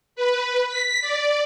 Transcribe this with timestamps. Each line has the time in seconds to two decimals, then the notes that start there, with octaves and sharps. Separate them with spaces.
0.16 B4
0.68 B6
1.01 D5